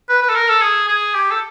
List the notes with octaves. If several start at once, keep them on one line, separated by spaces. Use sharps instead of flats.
B4
B4
A4
A#4
A4
G#4
G#4
G4
A4